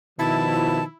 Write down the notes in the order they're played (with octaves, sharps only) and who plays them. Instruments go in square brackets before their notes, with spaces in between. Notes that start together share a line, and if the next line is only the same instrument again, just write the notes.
[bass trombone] B2 [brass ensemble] D#3 F3 [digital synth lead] E4 [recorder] A5